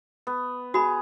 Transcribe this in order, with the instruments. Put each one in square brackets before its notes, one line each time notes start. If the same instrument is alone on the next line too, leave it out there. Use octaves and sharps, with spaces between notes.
[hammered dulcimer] B3
[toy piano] F#4 B5 [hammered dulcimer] G#4